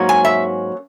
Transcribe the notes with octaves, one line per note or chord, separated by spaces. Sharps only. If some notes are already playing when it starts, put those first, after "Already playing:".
Already playing: G#2 F#3 A#3 C#4
G#5
E5